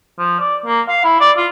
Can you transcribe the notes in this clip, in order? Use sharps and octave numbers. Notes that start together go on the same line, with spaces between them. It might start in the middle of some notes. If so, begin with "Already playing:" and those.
F3
D5
A#3
F5
E4
D5
F4